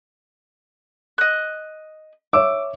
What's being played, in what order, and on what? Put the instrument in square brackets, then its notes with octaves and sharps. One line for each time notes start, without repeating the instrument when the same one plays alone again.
[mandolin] D#5 F#6
[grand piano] C#5 E5 E6 [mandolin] D6